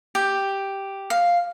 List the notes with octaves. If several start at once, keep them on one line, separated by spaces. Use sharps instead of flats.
G4
F5